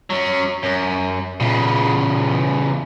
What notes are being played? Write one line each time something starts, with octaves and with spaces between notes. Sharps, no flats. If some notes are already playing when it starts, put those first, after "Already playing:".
F#3 C#4
F#2
E2 A#2 C#3